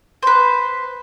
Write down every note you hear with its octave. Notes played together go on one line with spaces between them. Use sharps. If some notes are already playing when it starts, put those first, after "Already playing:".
B4 C5